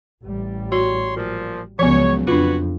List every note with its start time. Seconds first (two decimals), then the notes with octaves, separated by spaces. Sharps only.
0.24 A1 G3
0.72 F#4 C#5 C6
1.17 A#2 F3
1.79 C#2 C#3 F3 F#3 B3 C#5
2.27 F2 D4 F4 F#4 B4 C#5